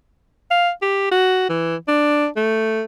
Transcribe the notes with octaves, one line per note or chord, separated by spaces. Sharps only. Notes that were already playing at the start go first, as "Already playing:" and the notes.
F5
G4
F#4
E3
D4
A3